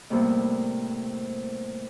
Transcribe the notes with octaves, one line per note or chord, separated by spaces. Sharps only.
A2 C3 G3 A#3 B3